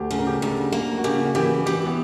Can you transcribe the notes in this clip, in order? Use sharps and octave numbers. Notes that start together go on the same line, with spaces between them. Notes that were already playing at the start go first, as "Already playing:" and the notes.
Already playing: D2 G4
C#3
A#4
G4
D2
A#3
F#4
C#3 G4
F#4
E3 G4
E3 G4
B3